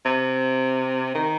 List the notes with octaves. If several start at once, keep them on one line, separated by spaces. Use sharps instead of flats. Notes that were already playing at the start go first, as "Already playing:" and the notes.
C3
D#3